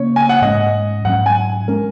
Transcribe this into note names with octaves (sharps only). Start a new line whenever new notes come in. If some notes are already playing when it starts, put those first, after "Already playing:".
Already playing: C#3 A#3 C#4 C#5
G#5
F#5
G#2 G#3 C#4 D#5
G#2 F#3 C#4 F#5
G#5
G#3 C#4 A#4